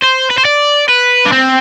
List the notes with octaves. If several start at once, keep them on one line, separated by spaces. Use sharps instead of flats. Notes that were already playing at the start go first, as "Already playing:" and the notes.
C5
B4
C5
D5
B4
D4
C4